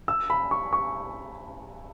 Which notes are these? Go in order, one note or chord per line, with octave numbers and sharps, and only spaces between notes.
E6
B5
C#6
C#6